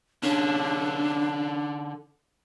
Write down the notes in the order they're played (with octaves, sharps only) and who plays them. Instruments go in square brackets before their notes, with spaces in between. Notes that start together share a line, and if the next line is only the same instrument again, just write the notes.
[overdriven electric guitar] D3 C#4 [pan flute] D4